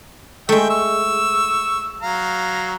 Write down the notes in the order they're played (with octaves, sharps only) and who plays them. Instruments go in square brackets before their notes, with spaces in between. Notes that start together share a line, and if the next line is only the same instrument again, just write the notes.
[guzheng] G#3 A3 [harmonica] E5 G5
[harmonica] C#6 E6
F#3 F5 A#5